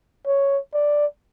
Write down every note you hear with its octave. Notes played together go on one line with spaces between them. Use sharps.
C#5
D5